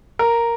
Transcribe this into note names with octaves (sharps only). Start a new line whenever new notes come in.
A#4